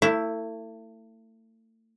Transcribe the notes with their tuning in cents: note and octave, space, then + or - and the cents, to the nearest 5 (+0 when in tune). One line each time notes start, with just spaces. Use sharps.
A3 +35 E4 +0